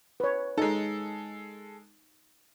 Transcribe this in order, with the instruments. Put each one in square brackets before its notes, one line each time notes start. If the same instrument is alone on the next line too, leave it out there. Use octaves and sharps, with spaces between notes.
[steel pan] B4 C#5
[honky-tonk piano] G#3 A4 [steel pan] D#4